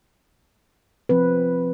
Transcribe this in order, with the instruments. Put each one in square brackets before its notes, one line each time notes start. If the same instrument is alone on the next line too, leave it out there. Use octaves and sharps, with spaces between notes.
[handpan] F3 C4 B4